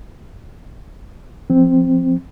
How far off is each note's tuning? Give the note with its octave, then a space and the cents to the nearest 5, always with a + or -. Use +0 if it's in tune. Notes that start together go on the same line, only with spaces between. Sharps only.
F3 +0 C4 +0